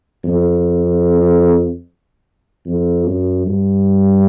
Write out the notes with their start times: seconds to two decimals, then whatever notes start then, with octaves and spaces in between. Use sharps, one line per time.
0.24 F2
2.66 F2
3.06 F#2
3.46 G2